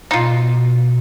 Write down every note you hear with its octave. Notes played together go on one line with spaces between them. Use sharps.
B2 D#4 F4